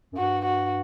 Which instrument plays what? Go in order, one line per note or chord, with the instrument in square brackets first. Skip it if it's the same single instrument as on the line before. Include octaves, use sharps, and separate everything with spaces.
[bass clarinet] F#2
[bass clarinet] G2 [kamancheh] F#4
[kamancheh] F#4